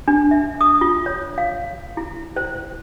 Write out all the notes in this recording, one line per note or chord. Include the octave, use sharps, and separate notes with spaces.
D4
E5
D#6
F4
C#5
F5
E4
C5